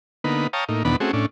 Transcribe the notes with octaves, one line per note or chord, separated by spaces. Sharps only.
D3 A#3 B3 D#4 B4
C#5 F5 G5 A5 A#5 D#6
A2 A#3 D#4
E2 B2 D#3 B3 D4 B5
A3 C4 C#4 F#4 G#4
A2 C#4 D4